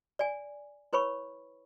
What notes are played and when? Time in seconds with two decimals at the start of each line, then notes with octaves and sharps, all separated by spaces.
0.19 D5 G#5
0.93 E4 B4 C#5 B5 C#6